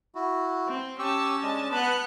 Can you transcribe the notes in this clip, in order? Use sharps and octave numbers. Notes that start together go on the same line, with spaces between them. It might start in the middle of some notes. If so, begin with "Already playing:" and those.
E4 F#4
C4
C#4 G4 A5 C#6 E6
G#3 D4 D#5
B3 F#5 A5 B5